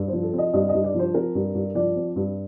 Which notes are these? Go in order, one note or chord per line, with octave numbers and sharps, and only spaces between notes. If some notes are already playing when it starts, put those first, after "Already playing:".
Already playing: G2
F3 C5
A4
C4
D#5
G2 D#5
G2 D#5
D5
F3 C5
C4 A#4
G2
G2
F3 D5
C4
G2